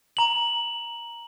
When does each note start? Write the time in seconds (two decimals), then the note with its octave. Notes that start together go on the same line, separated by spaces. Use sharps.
0.17 A#5 F#7